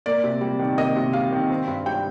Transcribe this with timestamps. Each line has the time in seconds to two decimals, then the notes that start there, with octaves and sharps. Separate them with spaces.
0.06 A#3 D5
0.24 C3
0.41 G3
0.59 D#3
0.78 A#3 D#5
0.96 C3
1.13 G3 F5
1.32 D#3
1.50 C4
1.68 G2
1.86 G3 G5